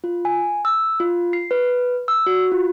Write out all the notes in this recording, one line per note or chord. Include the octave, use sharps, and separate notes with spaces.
F4
G#5
E6
F4
C7
B4
E6
F#4
F4